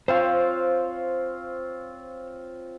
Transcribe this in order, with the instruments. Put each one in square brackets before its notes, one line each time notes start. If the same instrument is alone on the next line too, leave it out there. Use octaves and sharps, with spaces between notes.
[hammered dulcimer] C4 F4 C#5 [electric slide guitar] C5 F5